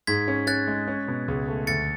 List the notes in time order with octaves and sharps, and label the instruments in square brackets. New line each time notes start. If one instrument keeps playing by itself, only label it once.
[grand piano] G#2 [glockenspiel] G#6 B6
[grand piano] C#4
[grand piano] C#4 [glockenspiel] F#6 A6
[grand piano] G#3
C#4
B2
C#2
A3
[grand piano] D2 [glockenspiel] A6 C#7